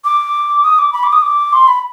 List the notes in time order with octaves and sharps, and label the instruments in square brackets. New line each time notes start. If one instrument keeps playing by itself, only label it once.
[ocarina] D6
D#6
D6
B5
D6
D#6
D6
C6
B5